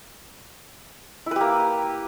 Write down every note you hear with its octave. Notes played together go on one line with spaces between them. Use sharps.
A#3 E4 G4 B4